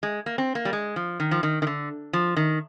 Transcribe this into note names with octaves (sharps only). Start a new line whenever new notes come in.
G#3
A#3
C4
A#3
G3
G#3
F3
D#3
F3
D#3
D#3
D3
F3
D#3